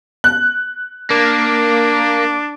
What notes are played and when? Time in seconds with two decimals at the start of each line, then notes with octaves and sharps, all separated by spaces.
0.24 F#6
1.11 A#3 D4